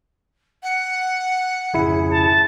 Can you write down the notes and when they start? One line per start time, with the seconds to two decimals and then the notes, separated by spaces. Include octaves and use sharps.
0.63 F#5
1.74 G#1 F2 C#3 E4 G#4 C#7
2.13 A5